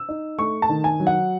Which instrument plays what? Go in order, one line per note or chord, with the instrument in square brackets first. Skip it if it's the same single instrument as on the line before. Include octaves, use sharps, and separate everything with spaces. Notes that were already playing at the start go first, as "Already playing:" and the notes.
Already playing: [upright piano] E6
D#4
A3 C#6
A5
D#3
G#5
F#3
F#5